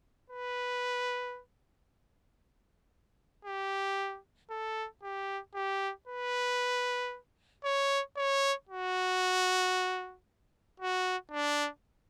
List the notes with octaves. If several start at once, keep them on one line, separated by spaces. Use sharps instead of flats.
B4
G4
A4
G4
G4
B4
C#5
C#5
F#4
F#4
D4